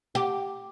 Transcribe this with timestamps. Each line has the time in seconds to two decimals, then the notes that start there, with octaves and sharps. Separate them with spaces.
0.15 G4